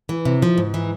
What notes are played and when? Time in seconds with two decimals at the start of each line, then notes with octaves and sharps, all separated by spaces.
0.09 E3
0.25 C3
0.42 F3
0.58 G#2
0.74 E3